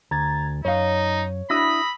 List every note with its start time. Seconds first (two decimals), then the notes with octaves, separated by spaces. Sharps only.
0.11 D2 A#5 G#6 A6
0.65 F#2 D#4 C#5 F5
1.50 D4 E4 F#4 B5 D#6 E6 A#6